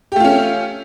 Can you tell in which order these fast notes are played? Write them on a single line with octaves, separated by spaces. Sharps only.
G4 A3 F4 C#4